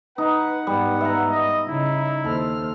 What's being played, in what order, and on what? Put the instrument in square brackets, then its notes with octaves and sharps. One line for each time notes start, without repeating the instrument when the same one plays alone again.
[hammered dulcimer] D#4 [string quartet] B4 [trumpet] F#5
[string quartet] G#2 B3 [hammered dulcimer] G3
[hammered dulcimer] E5 A#5
[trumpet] D#5
[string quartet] C#3 D#4 [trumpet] E4
[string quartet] D#2 C5 F6 [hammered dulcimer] A4